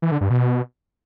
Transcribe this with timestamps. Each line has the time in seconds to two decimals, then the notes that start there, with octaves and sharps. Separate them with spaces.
0.02 E3
0.12 D3
0.21 G2
0.30 B2